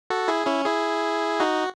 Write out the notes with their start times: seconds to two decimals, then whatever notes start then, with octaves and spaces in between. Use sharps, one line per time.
0.10 F#4 A4
0.28 E4 G#4
0.47 C#4 E4
0.65 E4 G#4
1.40 D#4 F#4